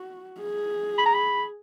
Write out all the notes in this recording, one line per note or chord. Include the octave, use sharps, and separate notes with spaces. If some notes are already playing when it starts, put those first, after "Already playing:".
Already playing: F#4
G#4
B5
A#5
B5